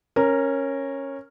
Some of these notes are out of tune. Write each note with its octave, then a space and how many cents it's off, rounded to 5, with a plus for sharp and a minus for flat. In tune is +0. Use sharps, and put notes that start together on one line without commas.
C#4 -10 A#4 +0